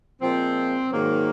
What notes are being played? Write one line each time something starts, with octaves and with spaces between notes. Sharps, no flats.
A#2 F3 G#3 C4
G#2 D#3 F#3 A#3